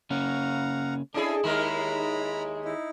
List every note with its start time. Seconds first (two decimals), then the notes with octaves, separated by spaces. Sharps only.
0.10 C#3 A#3 C#4 F5 F#5 A#5
1.14 C#4 D4 E4 G#4 A4 D#5
1.44 D#2 G#3 E4 A#4 A#5 B5
2.65 D#4 E4